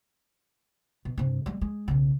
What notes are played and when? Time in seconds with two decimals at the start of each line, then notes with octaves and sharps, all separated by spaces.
1.05 B2
1.17 G2 C3
1.46 G3 G#3
1.61 G#3
1.88 B1 C#3